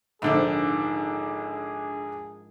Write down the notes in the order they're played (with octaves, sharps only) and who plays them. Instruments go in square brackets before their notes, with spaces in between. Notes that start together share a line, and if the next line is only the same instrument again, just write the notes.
[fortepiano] A#1 D3 [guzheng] G#2 D#3 F3 [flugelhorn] G#4